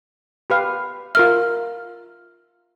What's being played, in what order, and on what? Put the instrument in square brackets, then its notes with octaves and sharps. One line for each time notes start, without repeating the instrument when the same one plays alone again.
[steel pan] G4 B4 F5
[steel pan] F4 A#4 E5 [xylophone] F6